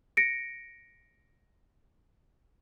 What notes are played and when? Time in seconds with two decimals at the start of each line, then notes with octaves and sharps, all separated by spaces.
0.17 A#6 C#7 D7